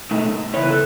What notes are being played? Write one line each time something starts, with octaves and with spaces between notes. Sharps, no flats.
B2 A3 D#4
C#3 E3 B3 E4 C#5
B4
A4